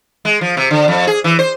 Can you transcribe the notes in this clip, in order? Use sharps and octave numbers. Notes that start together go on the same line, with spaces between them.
G#3
F3
C3
D3
F2
G#4
E3
C5